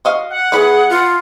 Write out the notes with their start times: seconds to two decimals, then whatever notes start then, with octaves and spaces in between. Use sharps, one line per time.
0.05 F#4 D#5 F5
0.30 F#5
0.52 E3 B3 G#4 B5
0.90 F4